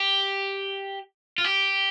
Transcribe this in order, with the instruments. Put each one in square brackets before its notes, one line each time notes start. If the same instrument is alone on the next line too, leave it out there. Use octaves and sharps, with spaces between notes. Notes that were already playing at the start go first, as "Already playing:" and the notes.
Already playing: [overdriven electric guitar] G4
F4
G4